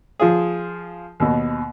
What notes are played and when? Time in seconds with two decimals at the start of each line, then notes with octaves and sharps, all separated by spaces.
0.19 F3 F4 G#4
1.20 D#2 B2